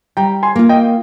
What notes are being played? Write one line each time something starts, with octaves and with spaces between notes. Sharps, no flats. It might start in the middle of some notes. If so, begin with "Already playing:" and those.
G3 G5 A#5
G#5 C6
A#3 F4
D#5 G5